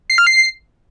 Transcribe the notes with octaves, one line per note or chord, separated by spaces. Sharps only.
C7
F6
C7